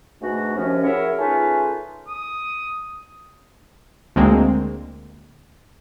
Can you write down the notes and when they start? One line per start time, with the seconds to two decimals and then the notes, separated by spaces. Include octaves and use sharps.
0.22 G#2 B2 A3 D4 F#4
0.56 D#2 C3 F3 C#4
0.83 E4 F#4 G#4 A#4 C#5 E5
1.18 A3 C#4 D#4 F4 G#4 B4
2.08 D#6
4.16 D2 G#3 A#3 C4